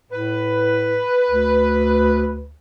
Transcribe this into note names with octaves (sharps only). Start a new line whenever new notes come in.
A2 B4
D2